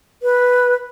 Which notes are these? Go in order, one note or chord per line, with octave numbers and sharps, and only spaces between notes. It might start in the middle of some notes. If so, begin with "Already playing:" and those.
B4